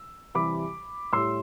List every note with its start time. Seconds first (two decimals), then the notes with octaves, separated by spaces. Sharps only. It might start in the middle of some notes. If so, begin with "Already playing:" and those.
Already playing: E6
0.35 C3 E3 G3 B5 D6
1.13 A2 G3 C6 E6